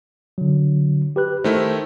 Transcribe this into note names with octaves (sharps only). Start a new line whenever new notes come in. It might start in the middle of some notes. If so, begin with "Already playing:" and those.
D3 F#3
G4 B4 F#6
D#3 A3 E4 C5